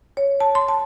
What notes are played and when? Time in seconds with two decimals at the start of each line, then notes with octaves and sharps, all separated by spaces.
0.17 C#5
0.40 A5
0.55 C6
0.68 A5